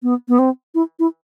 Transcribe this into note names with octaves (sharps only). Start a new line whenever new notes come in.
B3
B3
C4
E4
E4